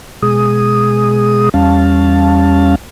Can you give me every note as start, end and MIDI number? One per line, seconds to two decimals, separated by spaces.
0.22 1.49 47
0.22 1.49 56
0.22 1.49 68
0.22 1.49 87
1.54 2.75 40
1.54 2.75 55
1.54 2.75 61
1.54 2.75 77
1.54 2.75 81